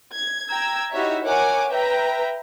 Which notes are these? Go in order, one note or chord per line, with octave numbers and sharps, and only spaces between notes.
G#6
G5 A#5 E6 G#6
D#4 E4 F#4 G4 C#5 E5
A#4 C#5 F#5 G#5 D6
B4 E5 G5 A#5